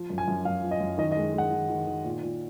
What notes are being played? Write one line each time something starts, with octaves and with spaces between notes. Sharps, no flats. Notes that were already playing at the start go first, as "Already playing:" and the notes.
Already playing: F3
F#2
G#5
F#2
F#2 F5
F3
D#5
F#2
D#3 D#5
D#5
G#3
G#3 F#5
D#3
D#3
D#3
A#2
A#2